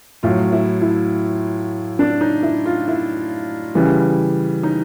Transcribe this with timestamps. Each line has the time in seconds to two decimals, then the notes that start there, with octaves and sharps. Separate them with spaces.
0.23 A2 F#3 F4
0.52 E4
0.82 E4
1.99 D4
2.21 D#4
2.43 E4
2.66 F4
2.88 E4
3.75 C#3 E3 G3
4.63 D#4